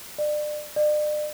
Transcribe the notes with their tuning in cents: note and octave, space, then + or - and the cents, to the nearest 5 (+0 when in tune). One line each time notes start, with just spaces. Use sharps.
D5 +30
D5 +40